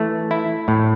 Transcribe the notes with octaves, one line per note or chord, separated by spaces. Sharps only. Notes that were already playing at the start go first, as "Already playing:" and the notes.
Already playing: E3 A3
E4
A2